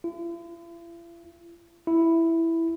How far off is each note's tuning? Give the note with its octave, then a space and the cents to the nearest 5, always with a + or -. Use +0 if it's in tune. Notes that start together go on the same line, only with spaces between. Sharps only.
E4 +45
E4 +0